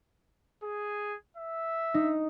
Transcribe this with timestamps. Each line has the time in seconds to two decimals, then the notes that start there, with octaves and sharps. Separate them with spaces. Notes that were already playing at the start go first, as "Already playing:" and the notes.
0.63 G#4
1.37 E5
1.94 D#4